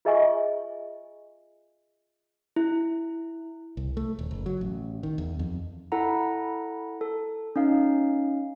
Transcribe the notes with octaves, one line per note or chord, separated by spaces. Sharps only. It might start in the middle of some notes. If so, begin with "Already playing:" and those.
F4 G#4 D#5 E5 G#5 C#6
E4
C2
A3
D#1
F#1
F#3
A1
D#3
E2
F2
E4 A4 F#5 A#5
A4
C#4 D#4 F5